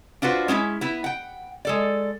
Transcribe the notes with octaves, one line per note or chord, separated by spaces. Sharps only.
D4 F4 F#4 B4 C5
G#3 C#4 D#4 E4
B3 E4
F#5 G5
G#3 A4 D5